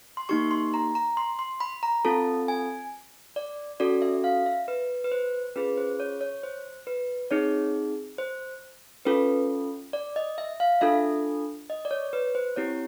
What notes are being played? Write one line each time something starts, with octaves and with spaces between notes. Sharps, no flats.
C6
A#3 D#4 G4 C#6
C6
A#5
A#5
C6
C6
B5
A#5
C4 F4 A4 A5
G#5
D5
C#4 F#4 A4 D5
E5
F5
E5
B4
B4
C5
C#4 F4 G#4 B4
C5
C#5
C#5
C5
B4
C4 D#4 G#4 C#5
C5
C#4 F4 A4 B4
D5
D#5
E5
F5
D4 F4 A4 E5
D#5
D5
C#5
B4
C5
C4 E4 G4 C#5